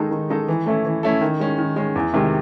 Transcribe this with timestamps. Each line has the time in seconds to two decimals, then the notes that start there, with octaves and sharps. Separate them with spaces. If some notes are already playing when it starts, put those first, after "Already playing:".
Already playing: D#3 G#3 D#4 A4
0.11 D#3
0.30 G#3 D#4 A4
0.48 E3
0.66 A3 C#4 E4 A4
0.85 E3
1.03 A3 C#4 E4 A4
1.21 D#3
1.40 G#3 C#4
1.59 D#3
1.76 G#3 C#4
1.95 E2
2.13 C3 D#3 G#3